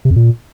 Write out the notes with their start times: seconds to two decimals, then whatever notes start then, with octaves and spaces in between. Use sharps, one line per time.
0.05 C3
0.11 F2
0.16 A#2